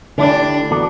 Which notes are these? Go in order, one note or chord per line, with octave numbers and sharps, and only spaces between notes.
D3 A3 D4 E4 G4
E3 B3 F#4 A4 D5